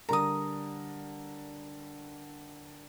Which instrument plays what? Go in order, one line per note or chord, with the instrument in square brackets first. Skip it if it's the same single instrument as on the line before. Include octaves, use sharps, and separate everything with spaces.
[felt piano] D3 G3 A#4 [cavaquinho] A#5 D#6